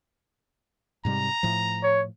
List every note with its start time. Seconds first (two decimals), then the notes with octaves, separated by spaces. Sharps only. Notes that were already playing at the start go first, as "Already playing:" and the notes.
1.05 G#2 C3 G3 A#5
1.43 A2 F3
1.83 C#5